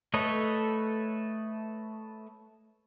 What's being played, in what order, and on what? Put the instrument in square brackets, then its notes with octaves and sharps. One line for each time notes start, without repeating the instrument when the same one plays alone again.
[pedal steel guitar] A3 A4 B4 C#5 D#5